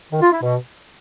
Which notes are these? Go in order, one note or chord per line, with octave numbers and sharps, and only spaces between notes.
D#3
F4
E4
B2